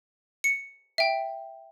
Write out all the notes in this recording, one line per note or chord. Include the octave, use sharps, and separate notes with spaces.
C#7
E5 G5